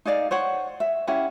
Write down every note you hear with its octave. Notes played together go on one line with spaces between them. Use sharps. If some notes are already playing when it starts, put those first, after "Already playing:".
D#4 G#4 D5 F5
C5 C#5 F#5
E5
C#4 E4 G4 F#5